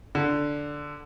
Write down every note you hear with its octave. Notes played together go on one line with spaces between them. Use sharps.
D3